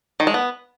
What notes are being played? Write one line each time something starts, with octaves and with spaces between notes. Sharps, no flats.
D#3
G#3
B3